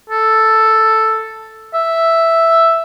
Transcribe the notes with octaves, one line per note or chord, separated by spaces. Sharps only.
A4
E5